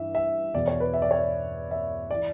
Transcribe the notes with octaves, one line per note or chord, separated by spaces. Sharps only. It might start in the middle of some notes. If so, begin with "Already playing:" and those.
Already playing: G2 E3 E5
E5
E2 B2 D5
C#5
B4
E5
D5
C#5
D5
E5
E3 D5